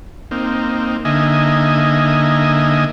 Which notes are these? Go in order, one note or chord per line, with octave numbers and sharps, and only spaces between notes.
A#3 C4 D#4
D3 A#3 D#4 D#5 E5 G#5